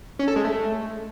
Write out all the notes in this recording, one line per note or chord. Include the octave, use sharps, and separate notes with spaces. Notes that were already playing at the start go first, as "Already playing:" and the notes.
C#4
A4
G#3
A3